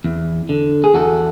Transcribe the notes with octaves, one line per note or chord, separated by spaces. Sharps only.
E2
D3
G#4
E2 F#4 A4